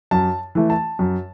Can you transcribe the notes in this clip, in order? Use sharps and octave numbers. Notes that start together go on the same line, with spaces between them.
F#2 A5
E3 A3
A5
F#2